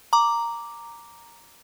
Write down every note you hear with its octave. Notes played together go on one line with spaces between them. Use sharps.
A#5 D6